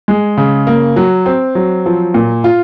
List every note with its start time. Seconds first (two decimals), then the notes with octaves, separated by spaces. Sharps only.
0.08 G#3
0.38 C#3
0.67 A#3
0.96 F#3
1.26 C4
1.55 F#3
1.86 F3
2.14 A#2
2.44 F4